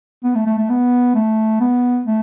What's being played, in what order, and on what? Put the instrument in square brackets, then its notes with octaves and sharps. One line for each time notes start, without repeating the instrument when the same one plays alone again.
[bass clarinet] B3
A3
A3
A3
B3
A3
B3
A3